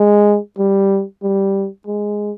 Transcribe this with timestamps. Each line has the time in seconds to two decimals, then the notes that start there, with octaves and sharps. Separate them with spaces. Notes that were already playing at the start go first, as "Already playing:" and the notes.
Already playing: G#3
0.58 G3
1.23 G3
1.87 G#3